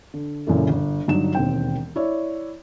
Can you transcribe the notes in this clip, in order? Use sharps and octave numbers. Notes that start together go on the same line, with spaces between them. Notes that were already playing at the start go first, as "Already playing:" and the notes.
D3
C#2 F#2 A#2 E3 A3
G1
G1 G2 F#3 G3 D#4 E7
E1 D#2 C4 G5
E4 C#5 D5